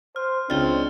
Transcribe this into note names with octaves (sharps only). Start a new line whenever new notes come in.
C5 F6
C#2 C4 D4 F6 A6 G7